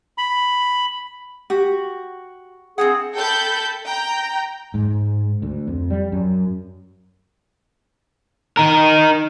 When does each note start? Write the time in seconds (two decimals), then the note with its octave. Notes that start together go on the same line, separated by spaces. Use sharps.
0.18 B5
1.50 F#4 G4
2.78 C4 C#4 G#4 F#5
3.16 A4 G5 A5 B5 G6
3.86 G5 A#5
4.74 G#2
5.42 D2
5.67 F2
5.90 G3
6.12 F#2
8.57 D#4 A#4